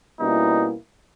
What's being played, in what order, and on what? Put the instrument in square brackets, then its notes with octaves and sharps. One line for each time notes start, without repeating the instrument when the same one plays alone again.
[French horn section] B2 G3 A#3 C#4 E4 [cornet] D#4